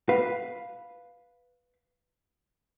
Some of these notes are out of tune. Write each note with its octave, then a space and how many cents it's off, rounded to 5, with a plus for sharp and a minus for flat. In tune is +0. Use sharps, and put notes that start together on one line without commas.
B4 +0 F5 +5